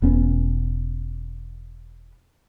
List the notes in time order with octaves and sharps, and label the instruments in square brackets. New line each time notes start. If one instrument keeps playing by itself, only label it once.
[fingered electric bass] E1 B3 C#4